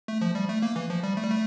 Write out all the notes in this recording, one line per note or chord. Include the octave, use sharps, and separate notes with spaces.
A3
F3
G3
A3
A#3
E3
F3
G3
A3
G3
A3